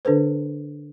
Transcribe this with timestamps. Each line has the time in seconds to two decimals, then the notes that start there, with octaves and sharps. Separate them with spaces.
0.05 D3 D4 A4 B4 C5